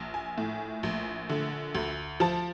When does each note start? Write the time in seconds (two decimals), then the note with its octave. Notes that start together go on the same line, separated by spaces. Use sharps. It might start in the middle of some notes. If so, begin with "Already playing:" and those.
Already playing: A#1
0.14 G#5
0.38 A2
0.83 A#1
1.29 D3
1.75 D2
2.20 F3 A5